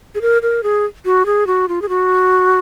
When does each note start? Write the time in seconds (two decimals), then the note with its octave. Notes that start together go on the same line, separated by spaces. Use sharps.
0.15 G#4
0.22 A#4
0.42 A#4
0.63 G#4
1.05 F#4
1.26 G#4
1.47 F#4
1.68 F4
1.82 G#4
1.89 F#4